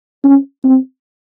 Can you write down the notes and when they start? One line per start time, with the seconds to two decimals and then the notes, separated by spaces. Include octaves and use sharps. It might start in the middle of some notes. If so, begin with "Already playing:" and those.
0.24 C#4
0.64 C4